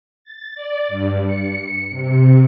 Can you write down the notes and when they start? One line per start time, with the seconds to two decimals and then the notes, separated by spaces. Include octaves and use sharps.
0.24 A6
0.55 D5
0.88 G2
1.25 C#7
1.90 C3